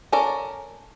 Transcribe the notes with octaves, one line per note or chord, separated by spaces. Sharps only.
C#4 A4 A#4 D5